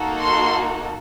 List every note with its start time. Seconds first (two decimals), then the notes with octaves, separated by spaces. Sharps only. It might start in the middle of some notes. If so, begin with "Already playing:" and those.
Already playing: A#3 D#4 F#4 A4
0.22 C6